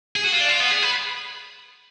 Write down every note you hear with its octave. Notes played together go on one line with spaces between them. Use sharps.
G#4
F#4
F4
D4
F4
B3
G#4
B4